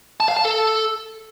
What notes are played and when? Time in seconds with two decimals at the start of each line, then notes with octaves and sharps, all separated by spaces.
0.20 A5
0.28 F5
0.37 A5
0.45 A4